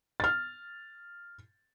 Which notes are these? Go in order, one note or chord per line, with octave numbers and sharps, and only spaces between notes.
F6 A6